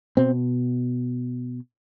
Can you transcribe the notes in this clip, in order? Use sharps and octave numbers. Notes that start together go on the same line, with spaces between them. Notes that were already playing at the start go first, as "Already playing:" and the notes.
B2 C4